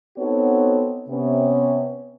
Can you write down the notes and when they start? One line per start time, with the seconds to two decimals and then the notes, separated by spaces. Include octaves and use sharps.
0.17 B3 C4 D#4 F#4 A4 C#5
1.09 C3 B3 C#4